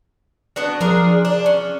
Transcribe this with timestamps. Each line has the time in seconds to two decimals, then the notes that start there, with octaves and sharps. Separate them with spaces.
0.56 B3 D4 F#4
0.81 F3 D4 G#4 A#4
1.25 D4
1.46 C#4